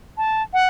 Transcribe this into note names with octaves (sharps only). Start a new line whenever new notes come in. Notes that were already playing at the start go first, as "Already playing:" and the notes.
A5
F#5